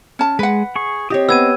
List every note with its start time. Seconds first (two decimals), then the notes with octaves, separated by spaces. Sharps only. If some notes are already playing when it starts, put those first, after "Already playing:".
0.19 C#4 A5
0.39 G#3 B4 F#5
0.76 G#4 C#6
1.10 C4 G4 C#5 D#5 D#6
1.29 B3 E6 G#6 D#7